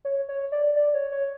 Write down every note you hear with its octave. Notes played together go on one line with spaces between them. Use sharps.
C#5
C#5
D5
D5
C#5
C#5